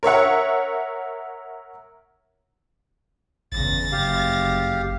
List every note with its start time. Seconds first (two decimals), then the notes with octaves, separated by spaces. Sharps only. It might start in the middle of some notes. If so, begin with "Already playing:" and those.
0.03 A#4 C#5 E5 F#5
3.52 G1 E2 C#3 A6 A#6
3.92 F#1 G4 F5